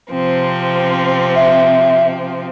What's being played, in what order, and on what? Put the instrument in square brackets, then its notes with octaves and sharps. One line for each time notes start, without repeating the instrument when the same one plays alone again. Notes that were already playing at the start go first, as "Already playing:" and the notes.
[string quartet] C3 F3 C4
[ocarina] E5